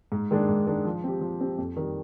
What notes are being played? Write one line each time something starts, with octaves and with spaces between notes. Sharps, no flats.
G#2
D#3 G#3 D4
G#2
D#3 G#3 D4
F3
C4 G4
F3
C4 G4
F2
D#3 G3